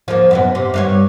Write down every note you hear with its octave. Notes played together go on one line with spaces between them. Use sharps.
F3 A#3
F#2 B2 B3
C3
G2 F4 C#5